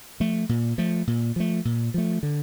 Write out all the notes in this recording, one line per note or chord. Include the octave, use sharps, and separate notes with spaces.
F3 A3
A#2
F3 A3
A#2
F3 A3
A#2
F3 A3
D3